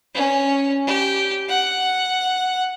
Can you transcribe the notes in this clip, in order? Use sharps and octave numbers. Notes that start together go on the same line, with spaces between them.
C#4
G4
F#5